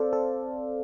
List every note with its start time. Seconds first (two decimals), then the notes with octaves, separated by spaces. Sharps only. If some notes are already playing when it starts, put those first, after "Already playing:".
Already playing: C4 A4 C5 D5 F5
0.13 A4